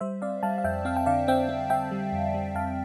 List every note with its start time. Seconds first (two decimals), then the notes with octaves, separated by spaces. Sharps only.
0.01 G3 C5 E5
0.22 C4 D5 F5
0.43 G3 F5 A5
0.58 F5
0.64 F2 E5 G5
0.85 C4 F5
0.97 G5
1.06 D3 D5 F5
1.28 C4 E5 G5
1.49 C4
1.70 C4 E5 G5
1.91 G3
2.12 F2
2.34 G3
2.55 F2 F5 A5